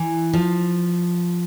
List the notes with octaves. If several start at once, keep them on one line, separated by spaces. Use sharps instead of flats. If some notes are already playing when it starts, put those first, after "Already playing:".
Already playing: E3
F3